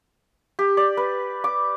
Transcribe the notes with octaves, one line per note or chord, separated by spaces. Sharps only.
G4
D5
B4
D6